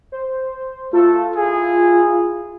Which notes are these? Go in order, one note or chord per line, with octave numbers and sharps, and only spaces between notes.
C5
A3 F4 A4
E4 G#4